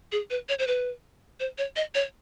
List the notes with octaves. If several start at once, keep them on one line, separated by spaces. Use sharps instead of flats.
G#4
B4
C#5
C5
B4
C5
C#5
D#5
C#5